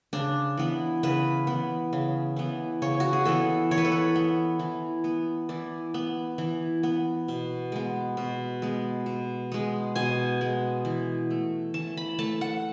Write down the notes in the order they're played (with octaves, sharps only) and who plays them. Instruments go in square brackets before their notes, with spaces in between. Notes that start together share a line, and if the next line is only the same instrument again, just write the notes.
[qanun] C#3 D4
E3 B3
C#3 B4
E3 B3
C#3
E3 B3
C#3 C#5
F#4
G#4
E3 B3 A4
E3 C#5
B4
A4
B4
B3
E3
B3
E3 D5
B3
E3
B3
B2
G#3 B3
B2
G#3 B3
B2
G#3 B3
B2 G#5
G#3 B3
E3
A3
E3 A5
B5
A3 A5
F#5